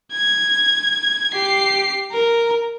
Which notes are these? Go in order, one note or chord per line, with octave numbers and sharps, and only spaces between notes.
G#6
G4 C7
A#4